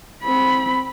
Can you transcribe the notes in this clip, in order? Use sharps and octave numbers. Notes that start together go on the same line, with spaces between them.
C4 B5